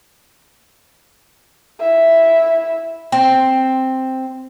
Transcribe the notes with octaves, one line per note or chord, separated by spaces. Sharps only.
E4 E5
C4